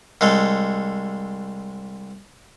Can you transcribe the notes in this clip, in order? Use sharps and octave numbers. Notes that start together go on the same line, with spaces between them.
C2 G#3 A3